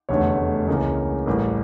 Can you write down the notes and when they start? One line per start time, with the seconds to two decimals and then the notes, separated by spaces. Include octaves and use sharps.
0.09 F1 E2 D3 A3 C#5
0.68 C#2 C#3 E3 A#3 C#4
1.26 A1 A2 G3 A#4